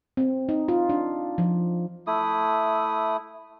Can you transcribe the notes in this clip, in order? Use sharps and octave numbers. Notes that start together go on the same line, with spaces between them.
C4
D#4
F4
D4
F3
A3 E4 D#6